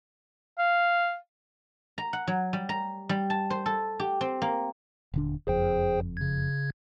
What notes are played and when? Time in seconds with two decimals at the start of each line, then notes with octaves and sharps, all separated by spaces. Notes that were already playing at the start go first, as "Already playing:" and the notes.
0.58 F5
1.98 A#5
2.13 F#5
2.27 F#3
2.53 G3
2.69 A#5
3.09 G3
3.30 A5
3.50 C5
3.66 A4
4.00 G4
4.21 C4
4.42 A#3
5.14 D#1 D3 D4
5.47 F#1 F2 G#4 C5 G5
6.17 C#3 G#6